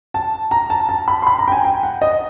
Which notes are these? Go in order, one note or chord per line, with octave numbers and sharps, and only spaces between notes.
A5
A#5
A5
A5
B5
C6
B5
A#5
G5
G#5
G5
F#5
D#5